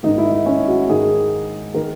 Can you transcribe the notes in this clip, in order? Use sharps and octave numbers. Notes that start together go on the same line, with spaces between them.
G#2 D#3 D#4
E4
D#4
C#4
F#4
G#2 D#3 G#4
D#3 A#4